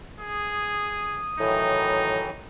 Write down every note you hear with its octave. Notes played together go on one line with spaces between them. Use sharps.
G#4 D#6
A2 D#3 E3 F#3 D#4